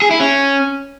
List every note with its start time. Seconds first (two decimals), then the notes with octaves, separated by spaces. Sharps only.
0.02 G#4
0.11 E4
0.20 C#4